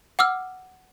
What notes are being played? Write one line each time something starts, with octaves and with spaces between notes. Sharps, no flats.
F#5 D6 E6 F6